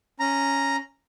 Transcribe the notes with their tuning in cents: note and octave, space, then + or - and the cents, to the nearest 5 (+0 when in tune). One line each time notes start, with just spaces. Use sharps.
C#4 +0 A#5 +0